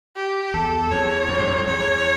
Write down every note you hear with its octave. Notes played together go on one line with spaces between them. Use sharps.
G4
E2 A4
E2 C#5
F2
G2
F2
E2 C#5